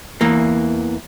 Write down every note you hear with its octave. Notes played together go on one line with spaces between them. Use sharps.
E2 E3 A#3